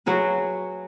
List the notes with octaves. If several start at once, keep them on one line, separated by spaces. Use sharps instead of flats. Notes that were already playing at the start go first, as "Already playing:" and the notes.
F#3 F#4 G#4 B4